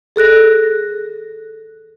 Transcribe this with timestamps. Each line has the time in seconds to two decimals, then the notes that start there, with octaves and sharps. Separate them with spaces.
0.16 G#4 A4 F#6 A#6